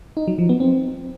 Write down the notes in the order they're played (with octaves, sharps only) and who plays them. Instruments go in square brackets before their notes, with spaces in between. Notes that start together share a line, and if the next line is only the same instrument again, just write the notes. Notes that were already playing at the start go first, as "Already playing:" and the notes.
[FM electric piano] D#4
F#3
F3
B3
C4